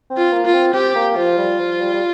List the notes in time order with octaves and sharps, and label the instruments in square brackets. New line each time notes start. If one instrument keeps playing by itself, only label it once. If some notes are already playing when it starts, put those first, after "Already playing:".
[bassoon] C4
[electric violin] F4
[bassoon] A#3
[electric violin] F4
[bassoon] C4
[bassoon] C4 [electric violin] G4
[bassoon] A#3
[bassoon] F3 [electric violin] F4
[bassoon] G3
F3
G3
G3